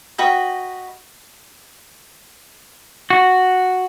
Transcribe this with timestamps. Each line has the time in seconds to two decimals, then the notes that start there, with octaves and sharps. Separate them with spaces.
0.18 F#4 B4 D#5 G5
3.10 F#4